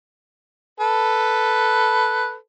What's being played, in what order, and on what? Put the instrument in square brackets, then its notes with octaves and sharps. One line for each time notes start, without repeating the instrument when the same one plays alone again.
[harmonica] A4 B4